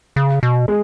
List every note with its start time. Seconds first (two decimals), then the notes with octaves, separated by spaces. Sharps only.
0.16 C#3
0.43 B2
0.68 G#3